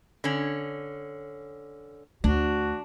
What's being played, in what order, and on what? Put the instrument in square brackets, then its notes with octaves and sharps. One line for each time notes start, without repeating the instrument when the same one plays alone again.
[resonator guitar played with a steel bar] D3 C#4
[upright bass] D2 [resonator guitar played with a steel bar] D4 [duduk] F#4